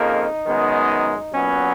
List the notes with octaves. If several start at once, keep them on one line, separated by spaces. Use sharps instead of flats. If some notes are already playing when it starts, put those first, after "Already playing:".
Already playing: F2 C#3 F3 A#3 D#4
F#2 D#3 G#3 B3
A#2 F#3 B3 C#4